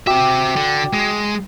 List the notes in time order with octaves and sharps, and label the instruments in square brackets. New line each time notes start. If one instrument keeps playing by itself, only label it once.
[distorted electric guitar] C4 E5 [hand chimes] F#4 G5 D6
[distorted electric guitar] D3
G#3